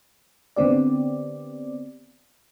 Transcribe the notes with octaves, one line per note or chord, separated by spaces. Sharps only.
D3 B3 C4 G4 D5